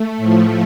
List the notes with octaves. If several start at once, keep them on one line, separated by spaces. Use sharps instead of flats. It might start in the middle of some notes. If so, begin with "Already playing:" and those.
Already playing: A3
A2 F3